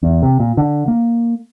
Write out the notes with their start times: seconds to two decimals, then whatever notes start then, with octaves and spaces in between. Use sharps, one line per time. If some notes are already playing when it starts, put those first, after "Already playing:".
0.03 E2
0.23 C3
0.40 A#2
0.57 D3
0.88 A#3